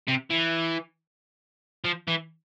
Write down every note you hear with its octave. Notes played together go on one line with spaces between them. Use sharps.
C3
E3
F3
E3